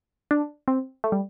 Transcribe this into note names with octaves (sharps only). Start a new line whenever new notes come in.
D4
C4
A3
G3